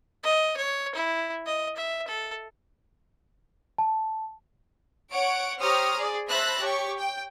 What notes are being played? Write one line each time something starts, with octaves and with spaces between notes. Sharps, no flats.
D#5
C#5
E4
D#5
E5
A4
A5
C#5 F#5 D7
G4 C5 C#5 A#5 D#6 F6
G#4 D5
C5 E5 A5 B5 F#6 A#6
G4 C#5 C#6
G5